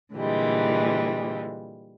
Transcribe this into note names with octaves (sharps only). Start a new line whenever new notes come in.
A#2 D3 E3 G3 G#3